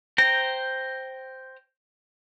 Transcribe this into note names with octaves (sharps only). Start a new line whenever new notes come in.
C5 G5 A#5